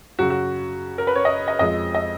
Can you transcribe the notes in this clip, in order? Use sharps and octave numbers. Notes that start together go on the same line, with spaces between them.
F#2 C#3 F#3 F#4
F#4
A#4
B4
C#5
D#5
D#5
F2 F3 G#3 D#5
D#5